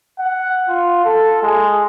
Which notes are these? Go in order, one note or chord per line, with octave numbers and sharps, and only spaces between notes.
F#5
F4
A4
G#3